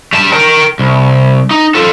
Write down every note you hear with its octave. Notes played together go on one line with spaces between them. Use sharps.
G3 A5
A#4 G5
C2
D#4
F4 A4